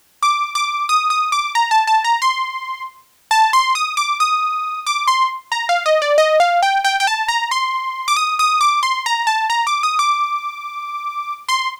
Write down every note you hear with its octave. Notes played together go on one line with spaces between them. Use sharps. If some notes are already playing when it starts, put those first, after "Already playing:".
D6
D6
D#6
D#6
D6
A#5
A5
A5
A#5
C6
A5
C6
D#6
D6
D#6
D6
C6
A#5
F5
D#5
D5
D#5
F5
G5
G5
G5
A5
A#5
C6
D6
D#6
D#6
D6
C6
A#5
A5
A#5
D6
D#6
D6
C6